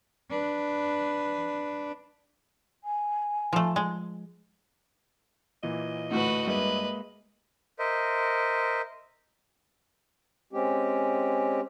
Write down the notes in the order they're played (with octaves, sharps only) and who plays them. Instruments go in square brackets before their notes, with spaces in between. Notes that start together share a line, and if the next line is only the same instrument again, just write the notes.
[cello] D4 B4
[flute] G#5
[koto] F3 A3
G#3
[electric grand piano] A#2 E3 A#3 [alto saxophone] D#5
[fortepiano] D2 A2 [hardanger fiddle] F#4 B4
[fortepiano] G2 [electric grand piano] G#3 A#3 E5 [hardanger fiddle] B4
[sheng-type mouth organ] A#4 C5 D#5 E5
[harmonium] G#3 C4 C#4 G4